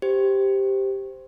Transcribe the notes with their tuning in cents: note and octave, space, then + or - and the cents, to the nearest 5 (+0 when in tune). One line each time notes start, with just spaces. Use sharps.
G4 +0 C5 -10